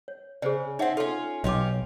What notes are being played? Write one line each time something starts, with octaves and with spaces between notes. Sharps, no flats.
C#5
C#3 G#4 C5 D5
C4 C#4 D#4 E5 F#5
C#4 F4 A4 C6
B1 C#4 F4 G4 D#5 D6